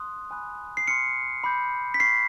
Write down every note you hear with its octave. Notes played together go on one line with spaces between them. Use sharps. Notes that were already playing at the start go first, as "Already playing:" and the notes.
Already playing: C6 D#6 F#6
G#5 B5 D#6 F#6
C7
C6 F6 C#7
B5 D6 G6
B6
C#6 F6 C7